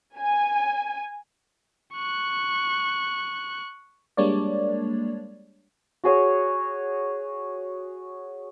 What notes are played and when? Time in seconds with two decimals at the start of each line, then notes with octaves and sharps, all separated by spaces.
0.17 G#5
1.94 C#6 F#6
4.17 G3 G#3 A#3 D4 C#5 D5
6.04 F#4 G#4 C#5